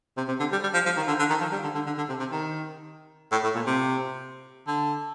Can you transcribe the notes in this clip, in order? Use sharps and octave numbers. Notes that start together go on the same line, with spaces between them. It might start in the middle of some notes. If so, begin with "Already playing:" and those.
C3
C3
D3
G3
G3
F3
F3
D#3
D3
D3
D#3
F3
G3
D3
D3
D3
D3
C3
C3
D#3
A2
A2
A#2
C3
D3